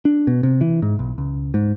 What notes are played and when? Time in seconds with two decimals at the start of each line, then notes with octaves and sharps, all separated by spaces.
0.05 D4
0.27 B2
0.43 C3
0.61 E3
0.82 G#2
0.99 B1
1.18 C#2
1.54 G#2